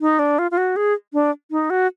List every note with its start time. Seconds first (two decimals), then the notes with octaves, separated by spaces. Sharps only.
0.01 D#4
0.19 D4
0.39 F4
0.51 F4
0.57 F#4
0.76 G#4
1.14 D4
1.51 D#4
1.70 F#4